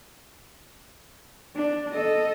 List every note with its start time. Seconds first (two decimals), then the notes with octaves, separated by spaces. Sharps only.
1.56 D4
1.92 A4 D#5